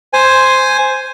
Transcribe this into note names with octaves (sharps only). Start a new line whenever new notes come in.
C5 G#5